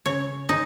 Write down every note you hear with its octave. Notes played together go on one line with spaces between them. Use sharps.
C#3 C#5
G#3 D#4